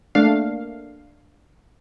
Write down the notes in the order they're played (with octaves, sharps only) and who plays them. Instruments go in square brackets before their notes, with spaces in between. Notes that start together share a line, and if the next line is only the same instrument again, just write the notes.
[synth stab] A3 A#3 D4 F5